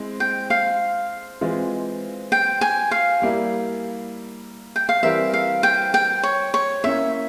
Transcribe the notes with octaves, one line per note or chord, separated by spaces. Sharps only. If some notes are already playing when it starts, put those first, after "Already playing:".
Already playing: G#3 C4 E4
G5
F5
E3 G#3 C4 F4
G5
G#5
F5
G3 A#3 E4
G5
F5
E3 G3 C4 E4 A#4 E5
F5
G5
G5
C#5
C#5
A#3 C#4 E4 E5